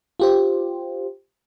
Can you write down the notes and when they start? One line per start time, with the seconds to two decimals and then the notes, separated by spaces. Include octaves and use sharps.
0.20 F4 G4 C5